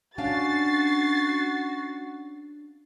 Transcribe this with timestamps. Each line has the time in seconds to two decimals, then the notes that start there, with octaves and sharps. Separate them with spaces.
0.18 C#4 D4 F#4 F5 A6 C7